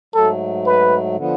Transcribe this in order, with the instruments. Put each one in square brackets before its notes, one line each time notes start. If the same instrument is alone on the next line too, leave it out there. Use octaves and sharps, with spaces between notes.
[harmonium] G#2 F#3 A3 [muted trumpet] A4
[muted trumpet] B4
[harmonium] D3 F3 B3